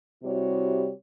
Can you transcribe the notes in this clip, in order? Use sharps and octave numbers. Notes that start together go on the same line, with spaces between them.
C3 G3 E4 F#4 C#5